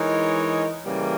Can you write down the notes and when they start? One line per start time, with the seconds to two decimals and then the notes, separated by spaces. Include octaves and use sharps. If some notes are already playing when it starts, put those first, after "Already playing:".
Already playing: E3 G#3 D#4 A#4 C#5
0.85 C#3 E3 G3 A#3